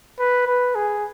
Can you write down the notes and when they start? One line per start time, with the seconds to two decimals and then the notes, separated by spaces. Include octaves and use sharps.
0.19 B4
0.47 B4
0.75 G#4